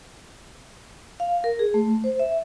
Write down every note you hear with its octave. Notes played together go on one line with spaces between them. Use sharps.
F5
A#4
G#4
A3
C5
E5